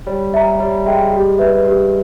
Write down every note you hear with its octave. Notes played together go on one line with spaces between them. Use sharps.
G3 C#5
E5 G5 A#5
G3 C#5
G#3 E5 G5 A#5
G4
B4 E5
G4